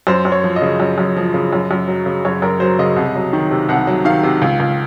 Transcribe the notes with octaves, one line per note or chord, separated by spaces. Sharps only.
F#2 C5
F#2
C#5
F3
D#5
C#3
F#2
F#2
F3
C#3
F#2
F#2
F#3
C#3
F#2 C#5
F#2 A#4
F#3 C5
C#3 D#5
C2
F#3
D#3
C3
C2 F#5
F#3
D#3 F5
C3
C#2
C#2